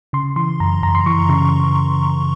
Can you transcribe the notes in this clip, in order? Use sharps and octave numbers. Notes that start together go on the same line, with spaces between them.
C#3 C6
E3 C6
F#2 A#5
F#2 A#5
C6
E3 C#6
C#3